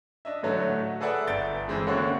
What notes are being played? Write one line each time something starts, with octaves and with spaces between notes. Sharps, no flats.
D4 D#5 E5
A2 D3 F#3 A3
G#4 A4 B4 D5 E5 F#5
G1 G6 A6 D7
E3 G#3 C4 E4
D3 A#3 C4 C#4 F#4